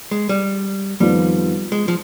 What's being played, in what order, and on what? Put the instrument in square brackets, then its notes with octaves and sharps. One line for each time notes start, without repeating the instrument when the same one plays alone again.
[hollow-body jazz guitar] G#3
G3
[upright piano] F2 D#3 B3 F4 [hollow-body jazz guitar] G3
[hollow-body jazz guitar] G#3
F3